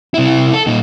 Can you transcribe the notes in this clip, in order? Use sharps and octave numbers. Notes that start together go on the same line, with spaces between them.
C3 E4
A4
A#2 D#4